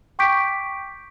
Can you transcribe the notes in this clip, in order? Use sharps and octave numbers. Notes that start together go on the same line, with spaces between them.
G5 C#6 D6 G6 B6 D7